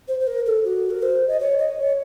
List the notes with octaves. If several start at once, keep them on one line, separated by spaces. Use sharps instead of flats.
C5
C5
A#4
A4
F#4
A#4
C5
D#5
C#5
D#5
C#5